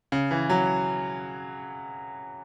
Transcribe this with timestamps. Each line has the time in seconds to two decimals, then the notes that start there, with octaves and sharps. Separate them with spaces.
0.12 C#3
0.31 E3
0.50 F#3